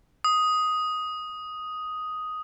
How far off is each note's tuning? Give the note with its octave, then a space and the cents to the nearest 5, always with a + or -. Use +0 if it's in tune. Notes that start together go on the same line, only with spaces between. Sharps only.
D#6 +5